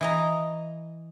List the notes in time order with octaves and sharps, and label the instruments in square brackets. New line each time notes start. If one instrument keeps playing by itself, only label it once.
[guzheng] E3 D#5 A#5